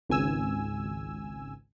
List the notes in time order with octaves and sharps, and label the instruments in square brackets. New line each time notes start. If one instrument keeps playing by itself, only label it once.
[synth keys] G#1 C#2 G#5 E6